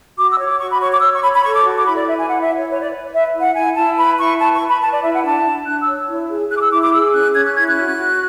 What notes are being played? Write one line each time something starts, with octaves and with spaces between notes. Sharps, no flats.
F#4 D6
E6
C#5
D6
F#4 C#6
B5
C#5 C#6
D6
C#5 E6
C#6
C#5 B5
B5
A4 C#6
D6
F#4
D6
E4 B5
D5
B4 E5
G#5
E4 F#5
E5
E4
C#5
B4 C#5
D5
B4
B4 E5
E4
F#5
E4 G#5
E4 A5
B4 B5
E4 C#6
B4 A5
C#6
B4
B5
B4 A5
D5
E4 E5
F#5
D4 A5
D4
D4 F#6
E6
C#5
E4
G#4
G#4 F#6
D6
E6
E4 D6
D6
G#4 E6
C#4 F#6
C#4 G#6
F#6
E4 G#6
F#6
F#4
F#4